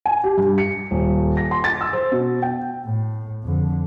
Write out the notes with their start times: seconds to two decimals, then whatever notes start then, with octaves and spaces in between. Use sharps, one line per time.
0.06 G#5
0.24 G4
0.37 G2
0.58 C#7
0.91 D#1
1.37 A#6
1.51 C6
1.64 A6
1.81 E6
1.93 C5
2.12 B2
2.42 G5
2.86 A2
3.44 F2 D3